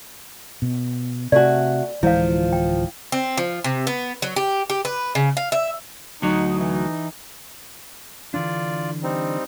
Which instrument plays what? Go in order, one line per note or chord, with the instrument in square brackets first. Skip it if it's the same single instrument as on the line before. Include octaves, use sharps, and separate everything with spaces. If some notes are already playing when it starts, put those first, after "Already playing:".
[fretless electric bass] B2
[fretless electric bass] C3 [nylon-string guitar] A3 F#4 [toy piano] D5 G#5
[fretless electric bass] D1 E3 G#3 [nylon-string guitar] F3 [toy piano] E4 F5
[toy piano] G5
[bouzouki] C4
F3
C3
B3
F#3
G4
G4
B4
C#3
F5
E5
[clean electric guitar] D2 F#3 [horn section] D#4
[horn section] E3 D#4
[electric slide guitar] D3 E3 D4 [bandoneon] F4 D5
[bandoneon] G3 C4 D#4